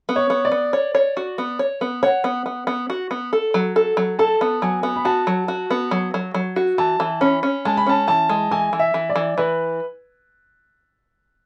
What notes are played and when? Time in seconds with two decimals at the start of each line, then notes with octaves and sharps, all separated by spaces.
0.09 B3
0.16 C#5
0.30 B3
0.45 D5
0.52 B3
0.73 C#5
0.95 C#5
1.17 F#4
1.38 B3
1.59 C#5
1.81 B3
2.03 C#5 F#5
2.24 B3
2.46 B3
2.67 B3
2.90 F#4
3.11 B3
3.33 A4
3.54 F#3
3.76 A4
3.97 F#3
4.19 A4 A5
4.41 B3
4.62 F#3 G#5
4.83 B3
4.96 B5
5.05 F#4 A5
5.27 F#3
5.48 F#4
5.70 B3
5.91 F#3
6.14 F#3
6.34 F#3
6.56 F#4
6.78 E3 A5
7.00 E3
7.21 C#4 B5
7.43 C#4
7.65 G#3 A5
7.77 B5
7.86 C#4 A5
8.08 E3 A5
8.29 G#3
8.51 E3 G#5
8.73 E3
8.79 E5
8.94 E3
9.09 D5
9.16 E3
9.38 E3 B4